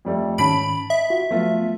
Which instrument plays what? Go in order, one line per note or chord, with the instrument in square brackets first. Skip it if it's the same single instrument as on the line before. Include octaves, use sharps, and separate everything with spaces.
[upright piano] F2 G3 A3
[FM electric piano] G#2 D#3 C#4 [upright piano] A5 B6 D7 [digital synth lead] B5
[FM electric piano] D#5 [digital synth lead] E5
[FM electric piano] F4 F#4
[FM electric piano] F3 F#3 B3 [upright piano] A3 F4